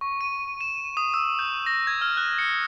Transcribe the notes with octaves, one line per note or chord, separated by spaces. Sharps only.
C#6
D#7
E7
D#6
E6
G6
A#6
G#6
F6
F#6
C#7